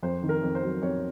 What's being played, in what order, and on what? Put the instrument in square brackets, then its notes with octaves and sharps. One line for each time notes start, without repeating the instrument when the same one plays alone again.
[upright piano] F2 C5
D#3
A#4
F2
C5
F#3
F2 C#5